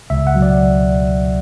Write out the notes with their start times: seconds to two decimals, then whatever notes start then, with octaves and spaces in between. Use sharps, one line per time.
0.10 C#2 E5
0.27 F#5
0.35 B2 F#3
0.42 D5